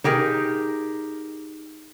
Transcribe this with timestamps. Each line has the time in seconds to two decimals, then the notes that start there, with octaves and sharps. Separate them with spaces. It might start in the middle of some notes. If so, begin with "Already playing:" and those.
0.04 D#4 G4 G#4 A#4